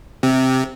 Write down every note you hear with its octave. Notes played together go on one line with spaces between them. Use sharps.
C3